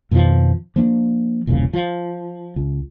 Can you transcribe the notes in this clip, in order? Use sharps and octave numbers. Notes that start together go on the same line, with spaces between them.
F2 B2 D#3 F3
F3 A#3 D4
E1 C2 A#2 C#3
F3
C#2